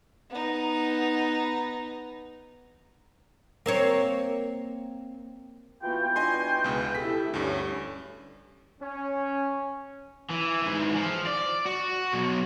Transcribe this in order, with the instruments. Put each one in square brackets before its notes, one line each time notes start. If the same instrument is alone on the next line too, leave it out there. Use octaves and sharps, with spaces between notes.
[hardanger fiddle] B3 D#4
[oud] A#3 C4 C#5
[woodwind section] E3 F#4 G5 [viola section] B3 F4
[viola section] D4 [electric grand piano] D#5 G#5 C6
[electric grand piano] C#2 B2 [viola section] G#4
[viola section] E4 G4 A4 [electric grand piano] B6
[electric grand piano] D2 G2 [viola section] G3 C#4 A4
[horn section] C#4
[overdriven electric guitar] E3
G#2 E3
F3
D5
F#4
B2 F#3